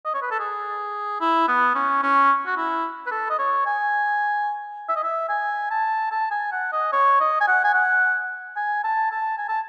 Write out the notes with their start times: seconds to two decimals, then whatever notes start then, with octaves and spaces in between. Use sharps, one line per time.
0.05 D#5
0.14 C#5
0.22 B4
0.30 A4
0.40 G#4
1.21 E4
1.48 B3
1.75 C#4
2.03 C#4
2.46 F#4
2.57 E4
3.07 B4
3.11 A4
3.30 D#5
3.39 C#5
3.66 G#5
4.89 E5
4.96 D#5
5.03 E5
5.29 G#5
5.71 A5
6.11 A5
6.31 G#5
6.52 F#5
6.72 D#5
6.93 C#5
7.20 D#5
7.41 G#5
7.48 F#5
7.64 G#5
7.74 F#5
8.56 G#5
8.84 A5
9.11 A5
9.38 G#5
9.49 A5